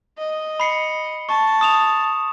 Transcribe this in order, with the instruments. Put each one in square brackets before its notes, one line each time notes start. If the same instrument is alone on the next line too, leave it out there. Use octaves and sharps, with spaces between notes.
[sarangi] D#5
[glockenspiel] B5 C7 C#7
[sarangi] A5 [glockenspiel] C#6
[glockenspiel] D#6 E7 F7